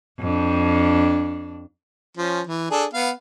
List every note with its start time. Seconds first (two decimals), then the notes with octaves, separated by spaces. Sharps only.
0.19 F2 D4
2.17 F3 C#4
2.47 E3
2.70 D4 G#4 A4
2.94 B3 F5